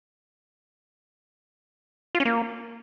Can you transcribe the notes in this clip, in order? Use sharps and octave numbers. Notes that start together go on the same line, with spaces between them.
F4
C#4
A#3